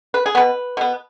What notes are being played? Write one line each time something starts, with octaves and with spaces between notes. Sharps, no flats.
B4
G#4
B2 B3 B4
B2 B3